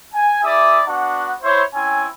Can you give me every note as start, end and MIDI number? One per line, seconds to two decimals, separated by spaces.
0.14 0.40 80
0.43 0.80 64
0.43 0.80 68
0.43 0.80 74
0.43 0.80 76
0.43 0.80 86
0.43 0.80 87
0.86 1.34 59
0.86 1.34 62
0.86 1.34 66
0.86 1.34 78
1.42 1.62 64
1.42 1.62 72
1.42 1.62 73
1.74 2.07 60
1.74 2.07 61
1.74 2.07 64
1.74 2.07 80